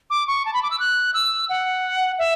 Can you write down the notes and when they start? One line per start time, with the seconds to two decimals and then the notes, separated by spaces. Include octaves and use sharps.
0.10 D6
0.27 C#6
0.45 A5
0.54 B5
0.63 D6
0.70 E6
0.80 F#6
1.14 E6
1.49 F#5
2.19 E5